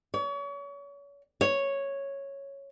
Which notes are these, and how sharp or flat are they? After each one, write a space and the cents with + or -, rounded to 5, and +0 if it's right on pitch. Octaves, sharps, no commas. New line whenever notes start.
C#5 +35
C#5 -5